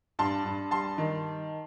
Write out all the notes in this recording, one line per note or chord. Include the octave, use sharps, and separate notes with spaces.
G2 A5 C6
G2
G3 A5 C6
D#3